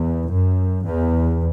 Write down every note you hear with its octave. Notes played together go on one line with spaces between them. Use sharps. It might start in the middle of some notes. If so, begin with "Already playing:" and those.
Already playing: E2
F#2
E2